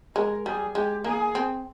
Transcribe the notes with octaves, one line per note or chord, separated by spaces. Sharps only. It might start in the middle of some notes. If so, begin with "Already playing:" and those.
G#3 A#4
G3 G#4
G#3 G4
A#3 G#4
C4